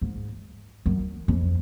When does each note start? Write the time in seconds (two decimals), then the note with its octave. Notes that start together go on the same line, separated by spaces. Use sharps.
0.02 G#2
0.86 F#2
1.28 F2